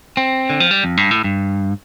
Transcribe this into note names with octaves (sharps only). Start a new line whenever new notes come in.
C4
D3
F3
G3
F2
G2
A2
G2